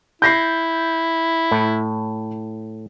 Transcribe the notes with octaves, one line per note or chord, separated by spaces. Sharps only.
E4 G6 A#6 C7
A2